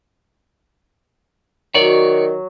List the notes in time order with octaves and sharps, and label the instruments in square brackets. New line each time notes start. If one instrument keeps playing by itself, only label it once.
[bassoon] D#3 [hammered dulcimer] F#3 [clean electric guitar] C#5 D5